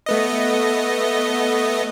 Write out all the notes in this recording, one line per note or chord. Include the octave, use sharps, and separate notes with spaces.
A3 B3 D#5